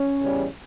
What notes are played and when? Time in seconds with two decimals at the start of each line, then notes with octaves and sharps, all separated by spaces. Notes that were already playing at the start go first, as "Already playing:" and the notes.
Already playing: C#4
0.21 E2 C#3 G3